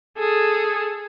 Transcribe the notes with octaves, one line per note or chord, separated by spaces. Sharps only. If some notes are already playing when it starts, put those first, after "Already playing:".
G#4 A4